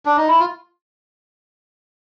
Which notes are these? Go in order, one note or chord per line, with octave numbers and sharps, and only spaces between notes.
D4
D#4
E4
F4